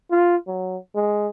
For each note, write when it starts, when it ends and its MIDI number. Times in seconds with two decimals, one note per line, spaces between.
0.11 0.36 65
0.47 0.77 54
0.95 1.28 56